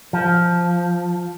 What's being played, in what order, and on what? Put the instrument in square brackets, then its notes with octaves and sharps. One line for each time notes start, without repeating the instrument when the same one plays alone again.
[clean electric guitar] F3